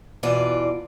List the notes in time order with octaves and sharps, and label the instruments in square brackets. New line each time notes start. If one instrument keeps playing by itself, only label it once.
[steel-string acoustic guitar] E2 B2 E3 F4 D5